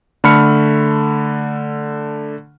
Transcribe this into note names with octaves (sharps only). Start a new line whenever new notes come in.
D3 A3 B5 F6 C#7